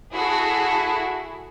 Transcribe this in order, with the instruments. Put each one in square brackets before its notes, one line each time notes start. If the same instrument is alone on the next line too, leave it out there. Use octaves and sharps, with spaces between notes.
[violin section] E4 F#4 G#4 A4